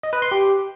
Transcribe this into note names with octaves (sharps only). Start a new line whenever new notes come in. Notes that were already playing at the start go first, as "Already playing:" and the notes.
D#5
B4
C6
G4